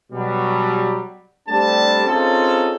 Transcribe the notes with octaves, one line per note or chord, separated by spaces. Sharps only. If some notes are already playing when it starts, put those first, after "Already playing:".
B2 F#3 G3
G3 A3 C4 D4 G4 A5
C4 C#4 D#4 F4 G#4 A4